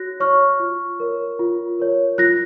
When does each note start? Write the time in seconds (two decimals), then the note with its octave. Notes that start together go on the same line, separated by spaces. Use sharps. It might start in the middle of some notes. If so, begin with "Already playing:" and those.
Already playing: F#4 C#5 F#6 A#6
0.20 C#5 C#6 F6
0.60 F4
1.00 A#4 C#5
1.39 F4
1.79 A#4 C#5
2.18 F4 F#6 A#6